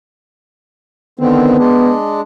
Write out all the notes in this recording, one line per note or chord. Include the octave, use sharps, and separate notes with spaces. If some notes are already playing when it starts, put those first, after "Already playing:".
D3 D#3 B3 C4
G#3 D4